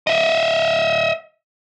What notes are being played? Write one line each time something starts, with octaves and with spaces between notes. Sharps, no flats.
D#5 E5